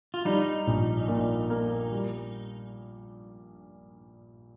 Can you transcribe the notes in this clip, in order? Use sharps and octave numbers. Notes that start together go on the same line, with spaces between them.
F4
G3 D#4
A#1
A#2
A#3
G3